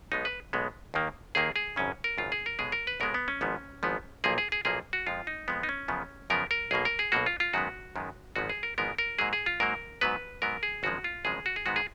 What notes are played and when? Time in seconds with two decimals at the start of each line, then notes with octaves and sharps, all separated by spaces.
0.12 B1 B2 G#3 B3 D#4
0.25 B4
0.53 B1 B2 G#3 B3
0.94 D#2 D#3 A#3
1.35 D#2 D#3 A#3 G#4
1.56 G#4
1.76 G#1 F#2 C#3 C#4
2.04 A#4
2.18 G#1 F#2 C#3 F4
2.32 G#4
2.46 A#4
2.59 B1 B2 G#3 B3 G#4
2.72 A#4
2.87 B4
3.00 B1 B2 G#3 B3 A#4
3.14 B3
3.28 C#4
3.41 G#1 G#2 F3 B3
3.83 G#1 G#2 F3 B3
4.24 B1 A#2 F3 A#3 G#4
4.38 G#4
4.52 G#4
4.65 B1 A#2 F3 A#3 G#4
4.93 F#4
5.07 F2 F3 G#3 F4
5.27 D#4
5.48 F2 F3 G#3 B3
5.63 D#4
5.69 C#4
5.88 F#2 C#3 F3 B3
6.30 F#2 C#3 F3 B3 A#4
6.51 A#4
6.71 B1 B2 A#3 G#4
6.85 A#4
6.99 G#4
7.12 B1 B2 A#3 F#4
7.26 F4
7.40 F4
7.53 F#2 D#3 G#3 B3 F#4
7.96 F#2 D#3 G#3 B3
8.36 G#1 G#2 F3 G#3 B3 F#4
8.50 G#4
8.63 A#4
8.78 G#1 G#2 F3 G#3 B3 A#4
8.98 A#4
9.19 G#2 F#3 A#3 G#4
9.33 G#4
9.46 F4
9.60 G#2 F#3 A#3 A#4
10.01 G#2 F#3 B3 B4
10.42 G#2 F#3 B3 A#4
10.63 G#4
10.83 G#1 F#2 C#3 F3 G#3 F#4
11.04 F4
11.25 G#1 F#2 C#3 F3 G#3 G#4
11.46 F#4
11.56 G#4
11.66 G#2 D#3 G#3 B3 F#4
11.76 G#4